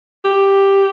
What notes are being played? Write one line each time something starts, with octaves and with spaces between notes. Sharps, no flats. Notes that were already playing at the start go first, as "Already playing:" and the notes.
G4